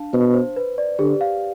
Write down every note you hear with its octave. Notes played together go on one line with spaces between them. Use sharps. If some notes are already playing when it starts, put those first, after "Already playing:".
Already playing: D4 F5 A5
B2 C5
C5
B4
D5
D3 G4
F5